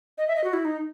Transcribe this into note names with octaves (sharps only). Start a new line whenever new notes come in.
D#5
E5
D#5
F#4
E4
D#4